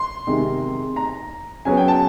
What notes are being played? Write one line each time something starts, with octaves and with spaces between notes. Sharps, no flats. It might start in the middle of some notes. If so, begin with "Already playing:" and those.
Already playing: C6
C3 D#3 G#3
A#5
C#3 F#3 B3 G#5
G5
A5